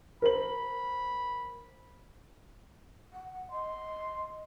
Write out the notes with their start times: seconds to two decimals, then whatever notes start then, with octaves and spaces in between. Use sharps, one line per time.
0.22 A#4 C5 B5 F#7
3.13 F#5
3.52 D#5 C6